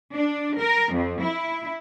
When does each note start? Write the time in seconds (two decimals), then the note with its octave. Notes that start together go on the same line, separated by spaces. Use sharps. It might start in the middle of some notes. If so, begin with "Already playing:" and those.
0.14 D4
0.59 A#4
0.94 F2
1.23 E4